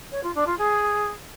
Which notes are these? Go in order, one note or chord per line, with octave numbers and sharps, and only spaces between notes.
C#5
F4
D4
F4
G#4